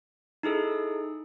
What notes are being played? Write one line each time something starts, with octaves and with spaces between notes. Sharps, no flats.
D#4 E4 G#4 A4